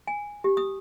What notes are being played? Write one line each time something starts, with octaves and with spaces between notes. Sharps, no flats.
G#5
G4
D#6